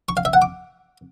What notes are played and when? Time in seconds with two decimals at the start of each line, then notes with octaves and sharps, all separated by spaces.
0.09 C#6
0.17 F5
0.25 E5
0.33 F#5
0.42 D6